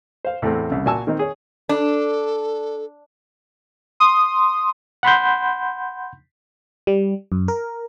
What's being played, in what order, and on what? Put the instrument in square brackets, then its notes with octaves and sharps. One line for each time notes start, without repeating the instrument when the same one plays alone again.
[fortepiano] C5 F5
E2 A2 A3 C4
C2 C#3
A#2 F#4 G#5 A5 E6
D#3 A#3 C4 D#4
G#4 C#5
[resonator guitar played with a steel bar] D4 [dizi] A4
[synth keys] C6 D#6
[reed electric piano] F#5 B5 C6 G6
[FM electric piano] G3
F#2
A#4